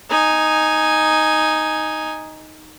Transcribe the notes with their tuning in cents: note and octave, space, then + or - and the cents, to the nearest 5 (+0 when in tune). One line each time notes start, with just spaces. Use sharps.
D#4 +0 G#5 +0